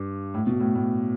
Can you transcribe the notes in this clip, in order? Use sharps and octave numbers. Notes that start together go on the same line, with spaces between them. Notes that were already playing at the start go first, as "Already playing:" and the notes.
Already playing: G2
A2
B2
A2
A2